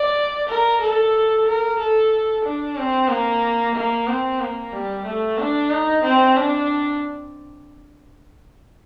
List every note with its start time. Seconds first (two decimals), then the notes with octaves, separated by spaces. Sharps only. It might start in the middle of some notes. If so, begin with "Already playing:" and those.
Already playing: D5
0.49 A#4
0.81 A4
1.47 A#4
1.79 A4
2.45 D4
2.77 C4
3.10 A#3
3.75 A#3
4.08 C4
4.41 A#3
4.73 G3
5.06 A3
5.39 D4
5.71 D#4
6.04 C4
6.37 D4